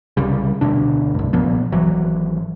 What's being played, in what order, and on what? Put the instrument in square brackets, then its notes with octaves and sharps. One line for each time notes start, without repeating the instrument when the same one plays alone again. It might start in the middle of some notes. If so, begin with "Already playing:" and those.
[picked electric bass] C2 C#3 G3
D2 B2 D4
C2 G2
B1 A#2 F3 B3
G#1 E3 F#3